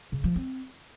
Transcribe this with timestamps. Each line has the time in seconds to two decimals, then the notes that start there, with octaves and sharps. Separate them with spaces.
0.12 C#3
0.24 F3
0.36 C4